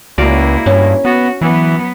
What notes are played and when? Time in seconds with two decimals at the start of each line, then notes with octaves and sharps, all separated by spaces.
0.18 C#2 A#3 E4 F#4 D5 F5
0.66 G2 C#4
1.05 B3 F#4
1.41 E3 F#3 B3